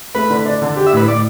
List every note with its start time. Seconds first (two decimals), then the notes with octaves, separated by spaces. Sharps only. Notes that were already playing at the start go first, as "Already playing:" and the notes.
0.15 A3 B4
0.30 D3
0.46 D4
0.62 D3
0.76 G4
0.87 E5
0.93 A2 B4
1.07 A2 D5